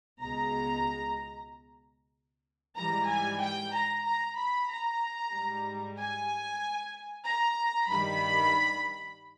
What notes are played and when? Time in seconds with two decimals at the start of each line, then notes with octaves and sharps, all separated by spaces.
0.22 C#2 B2 G#3 A#5
2.78 G#2 E3 G3 A#5
3.10 G#5
3.42 G5
3.74 A#5
4.06 A#5
4.38 B5
4.69 A#5
5.33 G#2 G3
5.97 G#5
7.25 A#5
7.89 G2 D#3 G3 B5